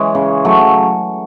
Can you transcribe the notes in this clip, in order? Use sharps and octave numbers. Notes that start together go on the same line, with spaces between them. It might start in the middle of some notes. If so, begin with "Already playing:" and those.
Already playing: E3 G#3 C#4
C#3
F#3 A3